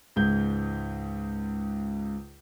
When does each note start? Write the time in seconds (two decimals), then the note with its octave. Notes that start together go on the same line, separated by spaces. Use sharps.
0.16 C#2 G#2 G6